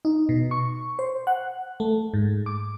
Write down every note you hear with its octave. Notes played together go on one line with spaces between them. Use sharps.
D#4
B2
C#6
C5
F#5
A3
G#2
D6